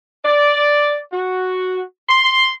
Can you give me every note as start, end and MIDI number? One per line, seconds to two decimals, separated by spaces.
0.25 0.98 74
1.13 1.81 66
2.09 2.49 84